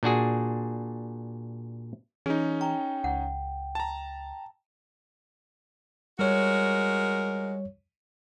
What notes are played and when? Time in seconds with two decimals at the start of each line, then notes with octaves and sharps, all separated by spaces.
0.03 A#2 D4 F#4 G#4
2.26 E3 C#4 D#4 G#4
2.61 G5 A#5
3.04 C#2 F#5
3.75 A5 A#5
6.19 G3 G#3 F#4 A#4 C#5